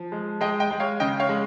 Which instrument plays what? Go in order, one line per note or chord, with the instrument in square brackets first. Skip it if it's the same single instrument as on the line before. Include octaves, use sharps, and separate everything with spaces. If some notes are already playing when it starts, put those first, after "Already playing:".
Already playing: [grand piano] F3
G#3
G#3 D#5 G5
D#5 G5
G#3
C#5 F5
C#3 D#5 G5
C#5 F5
G#3